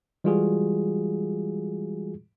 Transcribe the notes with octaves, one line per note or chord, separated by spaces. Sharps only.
E3 G3 G#3 F4 F#4 G#4